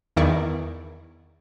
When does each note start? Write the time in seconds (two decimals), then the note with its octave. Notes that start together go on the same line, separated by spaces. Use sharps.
0.16 E2 D#3 E4 D5 C#6